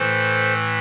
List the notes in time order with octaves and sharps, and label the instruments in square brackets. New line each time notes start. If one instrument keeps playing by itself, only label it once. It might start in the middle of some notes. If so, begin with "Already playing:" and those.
Already playing: [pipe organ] A2 E3 A3 A4 C5